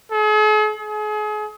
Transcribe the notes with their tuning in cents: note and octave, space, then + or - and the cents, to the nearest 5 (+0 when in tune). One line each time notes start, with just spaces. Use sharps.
G#4 +45
G#4 +35